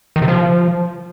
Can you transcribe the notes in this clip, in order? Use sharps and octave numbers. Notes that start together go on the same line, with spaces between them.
D#3
C3
F3